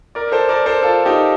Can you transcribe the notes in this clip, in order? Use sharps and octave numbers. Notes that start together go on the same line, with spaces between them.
A#4 D5
A4 C5
A#4 D5
A4 C5
F4 A4
D#4 G4